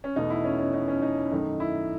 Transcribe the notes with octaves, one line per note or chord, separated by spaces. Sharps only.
C#4
E2 B2 A3 D#4
E4
C#4
C#4
D#4
C#4
D#4
F#2 D#3 A3
E4